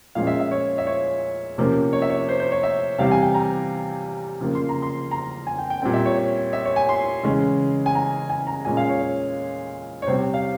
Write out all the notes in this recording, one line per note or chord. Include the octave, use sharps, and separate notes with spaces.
A#2 F3 G#3 C#4 F5
E5
E5
C#5
E5
C#5
C3 F3 A#3 C#4
C#5
E5
C#5
C5
C5
C#5
E5
C3 E3 G3 C4 F5
G#5
G5
A#5
C#3 F3 A#3
C6
A#5
C6
A#5
G#5
G5
G5
A#2 G3 C4 G5
E5
C#5
C#5
E5
C#5
G#5
C6
C#3 E3 G#3 C#4
G#5
A#5
G#5
A#5
A#2 G#3 C#4 G#5
F5
C#5
C#5
C#5
C3 G3 C4 C5
F5